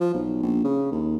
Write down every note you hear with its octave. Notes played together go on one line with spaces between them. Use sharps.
F3
B1
A#1
C#3
D#2